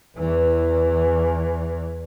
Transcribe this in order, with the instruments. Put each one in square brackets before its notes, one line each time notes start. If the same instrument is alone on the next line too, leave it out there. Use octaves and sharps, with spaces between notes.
[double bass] E2 E3